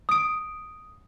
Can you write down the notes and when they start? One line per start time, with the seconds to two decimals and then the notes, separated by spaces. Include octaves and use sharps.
0.09 D#6 D7